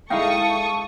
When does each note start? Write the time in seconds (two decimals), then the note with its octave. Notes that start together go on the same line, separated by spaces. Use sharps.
0.10 G#3 D#4 E4 A4 F5 G5 C#6 D#6